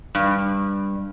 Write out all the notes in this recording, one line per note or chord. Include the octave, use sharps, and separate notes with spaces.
G2